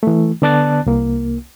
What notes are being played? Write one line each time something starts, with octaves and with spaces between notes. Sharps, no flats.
E3 A3
D3 B3 D5 A5 F#6 A6
C2 A#3